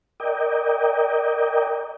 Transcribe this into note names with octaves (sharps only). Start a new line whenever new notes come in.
A#4 D5 D#5 G5